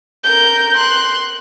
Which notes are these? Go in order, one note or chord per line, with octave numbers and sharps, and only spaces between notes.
A#4 G6
C6 F#6